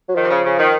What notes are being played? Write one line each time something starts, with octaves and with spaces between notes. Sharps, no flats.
F#3
D#3 F3
C3
C#3
C#3
D#3